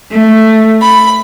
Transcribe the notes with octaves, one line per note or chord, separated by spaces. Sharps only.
A3
B5